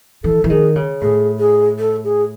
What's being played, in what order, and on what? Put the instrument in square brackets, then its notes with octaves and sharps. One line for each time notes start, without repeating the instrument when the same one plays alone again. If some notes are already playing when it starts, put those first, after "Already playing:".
[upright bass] E3 [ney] A4
[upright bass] E3
[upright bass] D#3 [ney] G#4
[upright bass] C#3
[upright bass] A2 [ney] G#4
[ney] G#4
A4
G#4